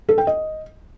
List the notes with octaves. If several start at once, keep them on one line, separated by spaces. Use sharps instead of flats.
A4
G5
D#5